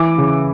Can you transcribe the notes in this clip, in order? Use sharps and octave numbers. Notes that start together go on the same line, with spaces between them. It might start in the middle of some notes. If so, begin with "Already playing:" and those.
Already playing: E3 D6
C#3